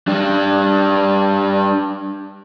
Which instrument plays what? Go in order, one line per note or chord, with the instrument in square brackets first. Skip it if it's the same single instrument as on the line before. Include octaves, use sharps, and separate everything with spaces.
[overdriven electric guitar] G3 D4